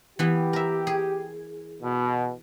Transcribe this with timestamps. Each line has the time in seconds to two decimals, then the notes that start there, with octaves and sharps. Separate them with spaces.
0.19 E3 B3 E4 G4
0.53 A#4 E5
0.87 G#4
1.83 B2